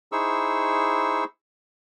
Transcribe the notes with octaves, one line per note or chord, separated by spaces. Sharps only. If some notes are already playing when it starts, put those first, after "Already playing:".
D#4 E4 G#4 C5 C#6 E6